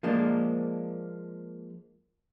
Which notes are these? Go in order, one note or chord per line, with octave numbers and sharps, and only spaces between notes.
F3 G#3 A#3 D4